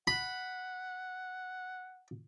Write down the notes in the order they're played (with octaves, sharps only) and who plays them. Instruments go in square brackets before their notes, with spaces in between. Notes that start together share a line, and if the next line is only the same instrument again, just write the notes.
[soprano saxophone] F#5 [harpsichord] B5